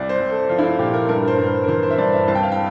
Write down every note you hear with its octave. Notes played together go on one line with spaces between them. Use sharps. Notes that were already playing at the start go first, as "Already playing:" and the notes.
Already playing: C2 D5
C5
C2
A4
F3 F4
E4
F4
A#2 G4
A#4
G2 A#4
C5
G2 A#4
A#4
E3 C5
C5
E5
G2 D5
E5
C2 A5
G5
F5
G5